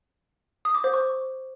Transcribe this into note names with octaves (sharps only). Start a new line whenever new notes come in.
D#6
D6
C5
C#6